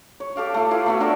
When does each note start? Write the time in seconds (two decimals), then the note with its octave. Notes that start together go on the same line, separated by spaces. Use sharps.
0.20 C#5
0.36 G4 A4 F5 D6
0.54 A3 F4
0.71 E4 F4 B4
0.86 A3 B3 F#4
1.00 D4 A#4 C#5 E5